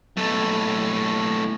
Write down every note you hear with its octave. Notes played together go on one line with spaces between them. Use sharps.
B1 A2